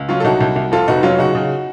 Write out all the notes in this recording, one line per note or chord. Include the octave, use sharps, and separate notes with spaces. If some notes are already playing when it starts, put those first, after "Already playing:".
Already playing: C#2
F#3 C#4 F4
A4
C2 D#4 F#4
C2
C2
F2 F4 A4
F1 D#4 F#4
F#3 C#4 F4
C#3 D#4 F#4
C#3